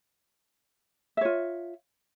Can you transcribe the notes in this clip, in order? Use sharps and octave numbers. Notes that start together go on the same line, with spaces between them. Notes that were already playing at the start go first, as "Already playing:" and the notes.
F4 C#5 E5